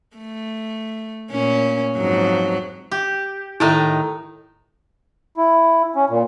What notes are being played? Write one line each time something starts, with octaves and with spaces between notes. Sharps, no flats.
A3
A#2 C#4
F2 G#2 F#3
G4
A2 D#3 D#4 E4
E4
C#4
A#2